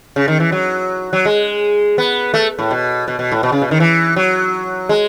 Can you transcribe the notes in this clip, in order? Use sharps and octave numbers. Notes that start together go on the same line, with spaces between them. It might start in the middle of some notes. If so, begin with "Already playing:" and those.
C#3
D#3
E3
F#3
F#3
G#3
B3
A3
A2
B2
B2
B2
A2
B2
C#3
B2
D#3
E3
F#3
G#3